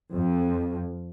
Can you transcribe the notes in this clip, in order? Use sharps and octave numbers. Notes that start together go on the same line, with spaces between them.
F2